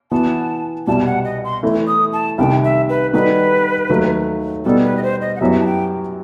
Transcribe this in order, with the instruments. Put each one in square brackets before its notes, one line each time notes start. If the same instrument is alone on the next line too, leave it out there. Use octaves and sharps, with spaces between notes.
[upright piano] E3 B3 F#4 [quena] A5
[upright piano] C2 B2 G3 [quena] A5
[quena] F#5
D#5
C6
[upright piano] E3 A3 E4
[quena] D#6
A5
[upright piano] C2 C3 D#3 [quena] G5
[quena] E5
B4
[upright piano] D#3 G3 D#4 F#4 A4 [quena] B4
[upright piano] D#2 D#3 F#3 A3
[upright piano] B2 G3 B3 D#4 [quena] A4
[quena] B4
D#5
C5
D#5
F#5
[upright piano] F#2 F#3 B3 E4 G4 [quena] E5
[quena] A5
G5